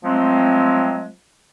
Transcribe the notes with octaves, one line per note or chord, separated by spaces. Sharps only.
F3 F#3 G#3 A3 C4